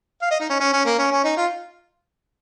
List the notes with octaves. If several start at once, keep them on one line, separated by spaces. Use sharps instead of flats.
F5
D#5
D#4
C#4
C#4
C#4
A#3
C#4
C#4
D#4
F4